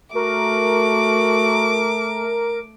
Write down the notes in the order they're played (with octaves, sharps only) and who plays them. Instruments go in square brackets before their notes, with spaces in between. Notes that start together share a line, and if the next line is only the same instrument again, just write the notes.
[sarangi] A3 [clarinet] F#4 [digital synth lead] A#4 [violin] D6